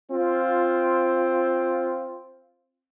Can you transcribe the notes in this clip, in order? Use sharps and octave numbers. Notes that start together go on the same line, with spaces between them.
C4 F4